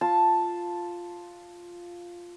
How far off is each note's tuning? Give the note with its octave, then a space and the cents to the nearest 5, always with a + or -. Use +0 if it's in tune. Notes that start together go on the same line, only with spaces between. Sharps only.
F4 +0 A5 +0